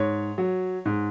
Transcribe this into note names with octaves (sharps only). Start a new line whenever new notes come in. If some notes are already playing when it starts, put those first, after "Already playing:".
Already playing: G#2 C#5
F#3
G#2